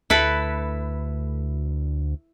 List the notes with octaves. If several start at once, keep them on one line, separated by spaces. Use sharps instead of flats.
D2 E4 A4 B4